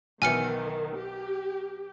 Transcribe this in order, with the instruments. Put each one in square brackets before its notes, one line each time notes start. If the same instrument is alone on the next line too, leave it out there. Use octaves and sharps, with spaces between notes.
[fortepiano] B1 E3 [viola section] D#3 [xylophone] G#5 F6 C#7
[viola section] G4